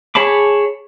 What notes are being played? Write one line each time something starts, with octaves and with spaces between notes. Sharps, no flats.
G#4 C#5 A5 B5 D6